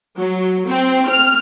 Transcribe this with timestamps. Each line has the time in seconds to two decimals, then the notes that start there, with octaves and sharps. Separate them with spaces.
0.17 F#3
0.67 C4
1.08 F6